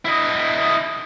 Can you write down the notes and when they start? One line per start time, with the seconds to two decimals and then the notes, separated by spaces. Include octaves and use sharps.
0.05 E4 D#5